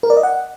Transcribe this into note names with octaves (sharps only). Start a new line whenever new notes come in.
A#4
D5
D#5
F#5